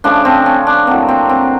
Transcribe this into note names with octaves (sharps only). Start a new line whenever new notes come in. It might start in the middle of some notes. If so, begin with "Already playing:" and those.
C#3 F3 A3 D4
C4
C#4
D4
A2 F#3 A#3 C4
C4
C4